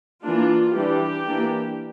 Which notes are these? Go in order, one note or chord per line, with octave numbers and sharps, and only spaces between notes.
E3 A#3 D4 F4
E3 G3 D4 G4
E3 A#3 D4